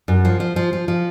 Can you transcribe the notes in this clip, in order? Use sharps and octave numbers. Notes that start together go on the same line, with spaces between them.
F#2
F3
F3
F3
F3
F3